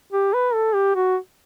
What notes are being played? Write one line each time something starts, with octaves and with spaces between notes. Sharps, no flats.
G4
B4
A4
G4
F#4